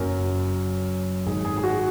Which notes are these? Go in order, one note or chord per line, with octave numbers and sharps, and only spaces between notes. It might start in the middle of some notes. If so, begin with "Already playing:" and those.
Already playing: F#1 F#2 F#3 A#4
G#1 G#2 G#3 G#4
G#4
G#4
F#4